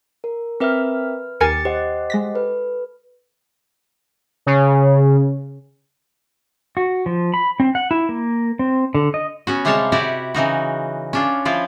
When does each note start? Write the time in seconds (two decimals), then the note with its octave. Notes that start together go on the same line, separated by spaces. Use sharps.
0.24 A#4
0.60 C4 A#4 B4 E5 F6
1.41 D#2 G4 A#4 G#5 A6 C#7
1.65 G4 C5 D#5 F#5
2.10 G#3 A#6 B6
2.34 A4 B4
4.46 C#3
6.77 F#4
7.06 F3
7.34 B5
7.60 C4
7.75 F#5
7.91 E4
8.09 A#3
8.59 C4
8.95 D3
9.14 D#5
9.47 B3 C#4 F#4
9.65 C3 G3 G#3 C#5 F5 A5
9.92 E4 F#4 G4 D5 F#5
10.34 C#3 E3 D#4 F#4
11.13 C#4 D4 F4
11.45 F3 E4 F4